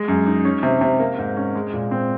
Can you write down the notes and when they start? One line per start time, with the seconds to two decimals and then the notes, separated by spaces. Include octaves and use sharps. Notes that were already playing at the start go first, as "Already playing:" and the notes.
Already playing: G#3
0.08 F#2
0.27 D#4
0.45 C#4
0.63 C3
0.81 C3
0.99 A#3
1.18 G#2
1.36 C#4
1.55 G#3
1.73 A#2
1.91 C4